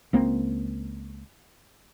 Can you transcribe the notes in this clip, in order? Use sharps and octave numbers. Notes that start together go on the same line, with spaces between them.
C#2 A#3 C4